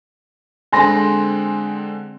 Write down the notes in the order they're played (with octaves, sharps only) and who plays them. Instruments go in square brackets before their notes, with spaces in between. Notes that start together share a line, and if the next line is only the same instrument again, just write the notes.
[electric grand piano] D3 G#3 C4 [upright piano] G#5 C6 A#6